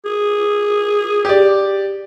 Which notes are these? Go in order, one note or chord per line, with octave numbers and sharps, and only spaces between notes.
G#4
G4 D5